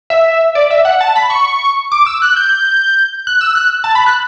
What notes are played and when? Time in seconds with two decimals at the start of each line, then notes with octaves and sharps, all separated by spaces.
0.10 E5
0.55 D5
0.70 E5
0.85 F#5
1.01 A5
1.16 B5
1.30 C#6
1.92 D6
2.06 E6
2.22 F#6
2.36 G6
3.27 F#6
3.41 E6
3.55 F#6
3.84 A5
3.95 B5
4.07 F#6